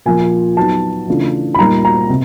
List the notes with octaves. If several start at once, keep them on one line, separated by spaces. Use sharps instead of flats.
A#2 F3 A#3 G#5
F#3 B3 D#4 A5
C#3 E3 A3 D4 F4
B5
A#2 G3 A#3 D#4 A#5
A#5
C3